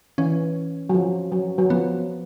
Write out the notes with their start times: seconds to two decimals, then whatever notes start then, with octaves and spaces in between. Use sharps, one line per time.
0.18 E3 C#4
0.89 F#3
0.94 F3
1.32 F#3
1.58 F#3
1.70 F3 B3